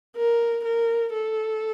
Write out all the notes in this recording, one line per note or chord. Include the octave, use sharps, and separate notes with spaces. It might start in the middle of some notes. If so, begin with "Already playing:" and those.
A#4
A#4
A4